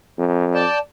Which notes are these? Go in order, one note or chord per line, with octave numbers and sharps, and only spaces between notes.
F2
D5 G5 A5